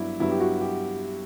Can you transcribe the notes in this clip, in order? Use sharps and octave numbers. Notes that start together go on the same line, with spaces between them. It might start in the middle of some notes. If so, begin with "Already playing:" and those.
Already playing: G2 F#3 B3 D4 E4
G2 F#3 B3 E4
G4
F#4
G4